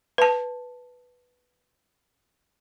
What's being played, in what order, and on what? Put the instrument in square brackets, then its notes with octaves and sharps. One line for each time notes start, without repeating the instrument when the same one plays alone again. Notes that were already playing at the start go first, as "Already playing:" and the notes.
[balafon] B4 A5